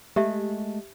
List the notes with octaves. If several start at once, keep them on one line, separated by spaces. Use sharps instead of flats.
G#3 A3 G4 E5